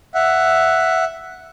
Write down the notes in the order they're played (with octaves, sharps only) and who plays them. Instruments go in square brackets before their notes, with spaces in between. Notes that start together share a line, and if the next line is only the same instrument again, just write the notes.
[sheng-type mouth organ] E5 F#5